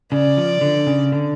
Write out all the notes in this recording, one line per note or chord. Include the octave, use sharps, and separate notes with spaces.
C#3 D5
F3
D3
C#3
D3